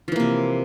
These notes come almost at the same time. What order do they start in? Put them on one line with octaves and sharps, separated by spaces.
F3 E3 A#3 C3